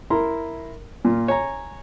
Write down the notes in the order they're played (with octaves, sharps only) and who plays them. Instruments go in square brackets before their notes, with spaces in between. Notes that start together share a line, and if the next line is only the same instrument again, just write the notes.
[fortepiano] E4 A#4 A#5 C6
A#2 F4
C#5 G#5 A#5